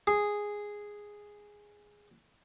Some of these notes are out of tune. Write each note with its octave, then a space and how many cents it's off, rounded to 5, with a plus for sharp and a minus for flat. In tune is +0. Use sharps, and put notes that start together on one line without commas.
G#4 -5